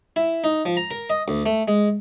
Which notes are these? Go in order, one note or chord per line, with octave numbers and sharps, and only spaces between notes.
E4
D#4
F3
A#5
A#4
D#5
D2
A3
G#3